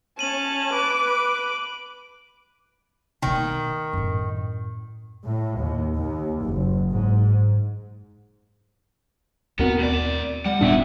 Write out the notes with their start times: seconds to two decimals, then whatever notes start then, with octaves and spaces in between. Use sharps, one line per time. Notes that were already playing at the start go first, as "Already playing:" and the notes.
0.19 C#4 A5 D#7 F#7
0.74 B4 D6
3.22 B2 D#3 A#3
3.93 F#2 A2
5.25 A2
5.59 D#2
5.95 D#2
6.43 F#1
6.91 G#2
9.59 D#2 B2 B3 C4 F#4 A#4
9.79 A2 D5
9.93 E7
10.46 G3 F#5
10.61 D#1 A#2 B3 D4 E5 G5